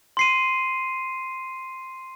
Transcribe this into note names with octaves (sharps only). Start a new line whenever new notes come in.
C6 C7 D#7